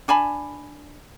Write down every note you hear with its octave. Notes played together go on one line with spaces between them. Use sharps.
D4 G#5 A5 B5